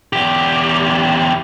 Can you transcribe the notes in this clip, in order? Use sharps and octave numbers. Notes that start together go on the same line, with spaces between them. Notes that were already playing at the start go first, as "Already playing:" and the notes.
E2 G4